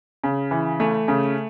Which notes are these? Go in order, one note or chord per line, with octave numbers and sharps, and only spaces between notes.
C#3
E3
A3
C#3